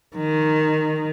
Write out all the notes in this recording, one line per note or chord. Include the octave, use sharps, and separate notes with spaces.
D#3